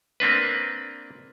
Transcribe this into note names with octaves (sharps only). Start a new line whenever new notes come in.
A#3 C4 D4 B4